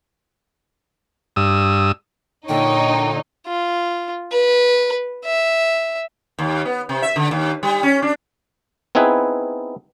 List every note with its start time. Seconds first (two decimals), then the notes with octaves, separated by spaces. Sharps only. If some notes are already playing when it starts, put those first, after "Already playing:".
1.36 G2 D#6 E6
2.49 A#2 D3 D#4 C#5 G5
3.47 F4
4.32 B4
5.25 E5
6.39 D#2
6.65 B3
6.89 C3
7.02 E5
7.16 D3
7.31 D#2
7.63 G3
7.83 C#4
8.02 D4
8.95 B3 C4 D#4 E4 G#4 B4